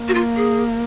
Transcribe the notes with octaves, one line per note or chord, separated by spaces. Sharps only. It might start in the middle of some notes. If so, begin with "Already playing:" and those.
Already playing: A#3
F#4
F4
G#4